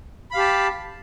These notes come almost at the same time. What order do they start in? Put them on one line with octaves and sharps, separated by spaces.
B5 F5 G4 A5